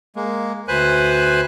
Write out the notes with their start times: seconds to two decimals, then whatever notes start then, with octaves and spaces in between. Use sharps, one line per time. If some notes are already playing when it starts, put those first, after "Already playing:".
0.16 G#3 A#3
0.68 D2 B4 C5 G#5 F#6